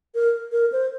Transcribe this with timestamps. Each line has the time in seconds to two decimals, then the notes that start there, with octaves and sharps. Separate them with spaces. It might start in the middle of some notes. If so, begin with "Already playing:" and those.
0.15 A#4
0.52 A#4
0.72 C5